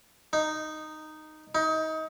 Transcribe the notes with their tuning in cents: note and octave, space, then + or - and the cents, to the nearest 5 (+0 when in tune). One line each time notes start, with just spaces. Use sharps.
D#4 -10
D#4 +25